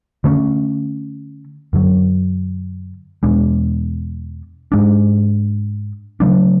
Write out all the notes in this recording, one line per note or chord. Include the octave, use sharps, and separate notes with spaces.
D3 A3 C#4
F#2 D3 F#3
E2 B2 G#3 D4
G#2 G#3 D4
C#3 F#3 A3 D4